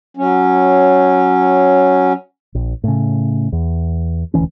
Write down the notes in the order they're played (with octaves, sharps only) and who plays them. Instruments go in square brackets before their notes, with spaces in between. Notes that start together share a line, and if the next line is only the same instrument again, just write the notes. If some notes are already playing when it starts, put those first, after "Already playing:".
[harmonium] F#3 C#4
[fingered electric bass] A#1
A2 C#3
E2
E1 D2 E3 C#4